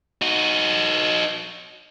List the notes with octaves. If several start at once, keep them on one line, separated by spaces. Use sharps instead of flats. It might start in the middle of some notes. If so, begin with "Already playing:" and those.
D#4 F#4